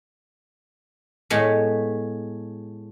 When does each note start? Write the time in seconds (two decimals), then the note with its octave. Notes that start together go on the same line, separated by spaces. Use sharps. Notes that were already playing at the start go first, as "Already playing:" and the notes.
1.30 A2 G#3 B3